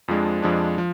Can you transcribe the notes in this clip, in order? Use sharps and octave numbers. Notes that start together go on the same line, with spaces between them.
F2 F3 G#3 D4
F2 F3 G#3 D4
F3